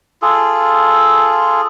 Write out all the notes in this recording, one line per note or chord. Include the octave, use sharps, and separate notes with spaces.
F4 G#4 A4